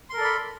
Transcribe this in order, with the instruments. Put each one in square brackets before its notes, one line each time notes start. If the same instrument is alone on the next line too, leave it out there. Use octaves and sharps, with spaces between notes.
[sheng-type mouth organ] C6
A#4
A4
D5
B5